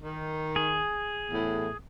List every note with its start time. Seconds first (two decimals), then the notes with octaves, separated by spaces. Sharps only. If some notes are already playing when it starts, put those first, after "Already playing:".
0.03 D#3
0.56 G#4
1.30 E2 A2